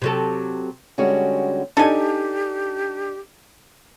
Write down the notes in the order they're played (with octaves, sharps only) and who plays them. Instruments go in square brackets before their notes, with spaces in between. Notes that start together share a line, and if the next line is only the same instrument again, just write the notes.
[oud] C3 F#3 A4
[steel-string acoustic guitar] D3 G3 G#3 C#4 F#4
[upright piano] D4 D#4 [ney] G4 [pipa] A4 G#5